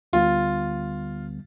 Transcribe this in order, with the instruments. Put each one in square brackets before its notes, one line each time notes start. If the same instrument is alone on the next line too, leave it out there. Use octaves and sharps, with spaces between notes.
[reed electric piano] D2 D3 G3 B3 [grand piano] F4